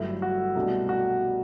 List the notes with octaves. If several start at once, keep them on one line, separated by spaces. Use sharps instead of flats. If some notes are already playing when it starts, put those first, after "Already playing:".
Already playing: G1 G2 F#3 A3 E4
F#4
C2 B2 A3 D4
F#4